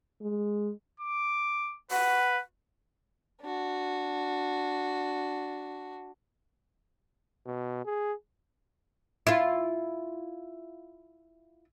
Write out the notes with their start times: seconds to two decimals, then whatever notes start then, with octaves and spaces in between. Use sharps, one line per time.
0.21 G#3
1.00 D6
1.91 B4 F#5
3.41 D4 F#4
7.46 B2
7.85 G#4
9.27 E4 F4